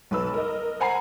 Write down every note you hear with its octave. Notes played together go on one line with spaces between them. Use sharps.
B1 B4 E6
A#4 D#5
C5 F#5 G#5 A#5 C7